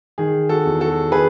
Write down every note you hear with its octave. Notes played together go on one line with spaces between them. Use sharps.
D#3 G#4
F#4 A4
E2
F#4 A4
D#3 G#4 B4